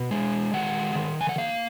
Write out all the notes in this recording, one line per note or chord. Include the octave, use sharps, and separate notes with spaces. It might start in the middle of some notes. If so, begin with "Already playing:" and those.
Already playing: B2
G#3
D#3 F#5
D#3
G#5
F#5
A#3 F5